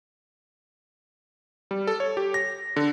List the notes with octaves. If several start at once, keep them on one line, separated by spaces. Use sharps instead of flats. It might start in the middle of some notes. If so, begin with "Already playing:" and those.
G3
A4
C#5
G4
A#6
D3